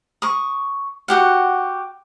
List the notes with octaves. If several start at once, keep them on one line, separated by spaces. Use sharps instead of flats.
C#6 D#6
F#4 G4 F#5